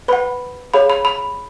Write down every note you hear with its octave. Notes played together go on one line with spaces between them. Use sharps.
B4 F#5 B5
G#4 C#5 F5 B5
B5
B5